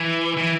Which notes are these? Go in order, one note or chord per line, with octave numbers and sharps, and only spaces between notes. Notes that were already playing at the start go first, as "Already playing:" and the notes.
Already playing: E3
E3